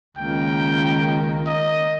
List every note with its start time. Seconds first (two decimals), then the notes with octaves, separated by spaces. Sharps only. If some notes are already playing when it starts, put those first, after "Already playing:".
0.18 C#2 D#3 A#3 G5
1.47 D#5